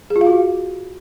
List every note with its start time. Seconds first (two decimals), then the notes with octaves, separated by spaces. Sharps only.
0.10 G#4
0.16 F4
0.21 F5
0.27 F#4